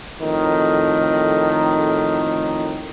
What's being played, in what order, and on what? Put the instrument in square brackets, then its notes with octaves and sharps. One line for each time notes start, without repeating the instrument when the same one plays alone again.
[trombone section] F2 A2 D#3